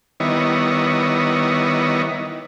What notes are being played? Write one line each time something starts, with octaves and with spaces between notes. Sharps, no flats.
D#3 G3 B3 E4 C#5 D#5